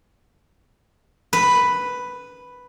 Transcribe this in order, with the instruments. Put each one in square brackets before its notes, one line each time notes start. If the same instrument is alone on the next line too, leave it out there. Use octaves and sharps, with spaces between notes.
[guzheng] B4